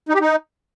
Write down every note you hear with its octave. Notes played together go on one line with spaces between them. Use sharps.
D#4
G4
D#4